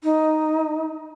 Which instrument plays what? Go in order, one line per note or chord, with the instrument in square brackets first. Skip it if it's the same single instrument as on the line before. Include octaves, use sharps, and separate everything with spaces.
[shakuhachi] D#4